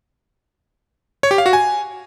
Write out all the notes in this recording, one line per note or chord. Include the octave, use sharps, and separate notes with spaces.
C#5
G4
F5
F#4
G#5